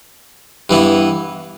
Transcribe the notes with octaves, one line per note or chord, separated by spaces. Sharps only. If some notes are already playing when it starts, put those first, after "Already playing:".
G2 E3 B3